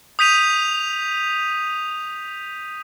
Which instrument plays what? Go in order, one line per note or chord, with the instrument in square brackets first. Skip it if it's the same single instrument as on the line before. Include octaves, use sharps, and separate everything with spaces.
[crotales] D#6 G6 B6 D#7 F7